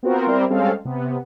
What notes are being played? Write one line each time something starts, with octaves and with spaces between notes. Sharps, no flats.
B3 C4 F4 F#4 A#4 C5
G3 C4 E4 A#4 C5 D5
G3 G#3 C4 C#4 A4 F5
C3 B3